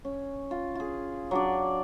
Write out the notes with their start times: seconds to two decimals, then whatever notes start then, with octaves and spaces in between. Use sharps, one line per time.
0.05 C#4
0.51 F4
0.75 F4 G#4
1.31 F#3 D4 D5